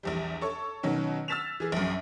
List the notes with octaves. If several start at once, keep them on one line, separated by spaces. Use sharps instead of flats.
A#1 E2 G3
A4 C#5 C#6
B2 D#3 F#3 C#4
E6 F6 A6 B6 E7 F7
E3 G#4
A#1 F#2